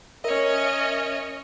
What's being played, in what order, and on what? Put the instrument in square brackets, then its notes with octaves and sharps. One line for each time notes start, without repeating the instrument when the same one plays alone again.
[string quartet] C#4 C#5 D#5 [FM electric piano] A#4 E5